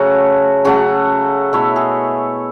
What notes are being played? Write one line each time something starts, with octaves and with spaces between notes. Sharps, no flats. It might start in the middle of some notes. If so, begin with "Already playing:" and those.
Already playing: C#3 F#3 A3 F#4
C#3 F#3 A3 F#4
B2 A3 E4 C#5
G#4